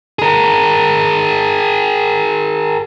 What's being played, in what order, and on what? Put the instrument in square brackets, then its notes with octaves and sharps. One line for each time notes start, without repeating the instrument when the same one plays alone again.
[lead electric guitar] G#4 A#4